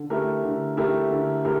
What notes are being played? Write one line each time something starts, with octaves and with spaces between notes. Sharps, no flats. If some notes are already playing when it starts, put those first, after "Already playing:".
Already playing: D3
A3 E4 G4 A#4
D3
A3 E4 G4 A#4
D3
A3 E4 G4 A#4